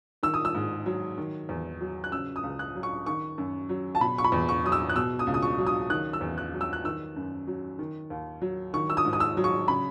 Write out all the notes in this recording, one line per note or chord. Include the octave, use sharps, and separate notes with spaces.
D#3 E6
D#6
E6
G#2
F#3
D#3
E2
F#3
F#6
C#3 E6
D#6
C#2
F#6
F#3
C#6
D#3 C#6
F#2
F#3
A5
B2 B5
C#6
B5
E2
C#6
F#3 D#6
E6
F#6
B2 E6
D#6
C#2
D#6
C#6
F#3
D#6
D#3 F#6
E6
E2
F#6
F#3
E6
F#6
D#3 E6
F#2
F#3
D#3
D#2
F#3
D#3 C#6
E6
D#6
G#2
D#6
E6
F#3
C#6
C#3 B5